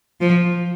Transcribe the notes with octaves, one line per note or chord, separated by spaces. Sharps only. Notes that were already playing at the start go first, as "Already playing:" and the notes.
F3